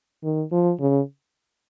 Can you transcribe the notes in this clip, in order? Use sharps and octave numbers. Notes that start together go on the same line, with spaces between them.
D#3
F3
C#3